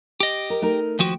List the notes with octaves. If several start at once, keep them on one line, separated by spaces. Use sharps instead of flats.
G4 D#5
A#4
A3 D#4 A#4
D#2 F3 F#4 G5